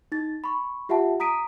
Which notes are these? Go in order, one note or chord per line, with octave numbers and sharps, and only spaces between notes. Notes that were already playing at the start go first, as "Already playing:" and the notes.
D#4 A6
B5 C#6
F4 G4 E5 F#5 A5
A#5 D#6 B6 D7 D#7